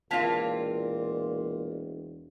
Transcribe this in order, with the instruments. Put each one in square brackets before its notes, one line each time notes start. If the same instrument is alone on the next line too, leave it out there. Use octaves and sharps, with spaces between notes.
[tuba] E1 [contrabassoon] A#2 [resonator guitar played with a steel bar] A#3 C4 F4 [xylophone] A5 B6 F7